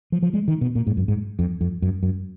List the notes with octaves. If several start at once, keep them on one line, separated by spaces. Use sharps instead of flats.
F3
F3
G#3
D#3
B2
A#2
G#2
F#2
G#2
F2
F2
F#2
F#2